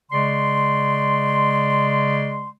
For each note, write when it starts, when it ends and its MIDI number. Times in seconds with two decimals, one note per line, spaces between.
0.12 2.50 49
0.12 2.50 56
0.12 2.50 74
0.12 2.50 84